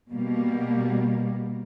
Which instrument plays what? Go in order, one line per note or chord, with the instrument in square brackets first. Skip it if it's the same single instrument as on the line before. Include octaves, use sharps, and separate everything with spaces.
[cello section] B2 G3 A#3